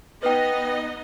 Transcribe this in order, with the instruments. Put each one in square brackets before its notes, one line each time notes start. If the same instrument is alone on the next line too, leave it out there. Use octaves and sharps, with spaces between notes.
[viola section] B3 D#4 D#5 [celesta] B4 G5